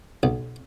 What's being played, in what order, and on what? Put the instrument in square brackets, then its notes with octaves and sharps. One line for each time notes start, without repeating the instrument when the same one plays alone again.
[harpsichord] B1